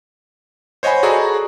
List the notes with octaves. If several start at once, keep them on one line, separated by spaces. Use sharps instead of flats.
C5 C#5 D#5 F#5 G#5 B5
F#4 G#4 A4 D5 A#5 B5